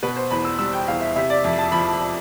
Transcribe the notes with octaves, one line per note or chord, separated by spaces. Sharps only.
B2 B4
C5
E2 B5
E6
G3 E6
G5
E2 F5
E5
C3 E5
D5
F2 E5
A5
F3 B5